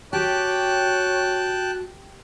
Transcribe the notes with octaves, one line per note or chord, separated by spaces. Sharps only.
F#4 G4 C#5 G5 A5 F#6